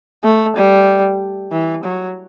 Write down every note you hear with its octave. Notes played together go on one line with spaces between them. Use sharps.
A3
G3
E3
F#3